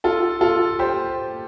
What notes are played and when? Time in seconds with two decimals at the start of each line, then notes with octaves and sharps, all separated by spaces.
0.04 F4 A4
0.41 F4 A4
0.79 G4 C5